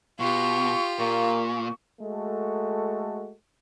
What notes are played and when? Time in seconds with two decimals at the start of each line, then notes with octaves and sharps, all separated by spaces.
0.20 B2 F4 G4 C#6
0.99 A#2 A#3 C#6
2.00 G#3 A3 F#4 A4